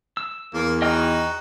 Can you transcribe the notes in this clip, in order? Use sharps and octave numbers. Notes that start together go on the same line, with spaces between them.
E6
E2 A#3
D#4 F#4 D#5 G5 F6